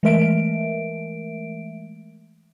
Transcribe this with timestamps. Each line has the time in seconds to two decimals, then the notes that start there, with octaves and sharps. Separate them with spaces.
0.03 E3 G#3 A3 A#4 E5 D7